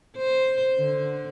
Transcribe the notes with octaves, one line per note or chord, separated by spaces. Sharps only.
C5
D3